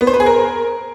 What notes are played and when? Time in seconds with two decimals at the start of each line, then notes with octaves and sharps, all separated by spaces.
0.01 B3
0.07 C5
0.14 B4
0.20 G#4
0.26 A#4